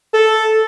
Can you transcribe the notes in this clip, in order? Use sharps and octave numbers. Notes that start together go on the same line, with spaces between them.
A4